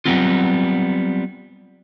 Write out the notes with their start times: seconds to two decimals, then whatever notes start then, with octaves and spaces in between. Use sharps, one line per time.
0.05 F#3 G3 A3 B3 C4 F4